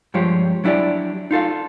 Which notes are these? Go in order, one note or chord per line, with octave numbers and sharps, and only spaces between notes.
G2 F3 G#3 F4 G4 C#5
F#3 D4 E4 G4 D5
D#4 F4 A4 F5